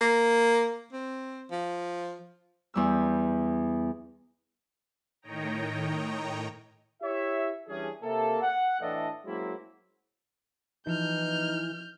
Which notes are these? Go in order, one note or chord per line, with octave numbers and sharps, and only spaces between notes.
A#3
C4
F3
E2 G3 E6
A2 D#3 C#5 D#5 G5 A#5
E4 G4 C#5 E5
E3 G3 C#4 D4 G#4
C3 A#3 A4
F#5
A2 E3 D4 A4 D5 D#5
F#3 G#3 A#3 C4 C#4 E4
E3 F3 D#4 F6 G6